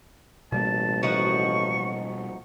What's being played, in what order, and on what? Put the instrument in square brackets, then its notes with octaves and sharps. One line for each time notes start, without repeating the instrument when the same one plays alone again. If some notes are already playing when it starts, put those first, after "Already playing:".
[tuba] A1 [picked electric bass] B2 G3 A#3 [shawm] A5
[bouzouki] F3 D#4 F#4 [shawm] C#6